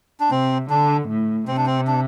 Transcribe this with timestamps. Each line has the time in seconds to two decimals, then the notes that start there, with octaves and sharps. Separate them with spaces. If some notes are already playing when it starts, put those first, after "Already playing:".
0.20 D4
0.30 C3 C4
0.70 D3 D4
1.08 A2
1.48 C3 C4
1.57 D4
1.66 C4
1.87 D4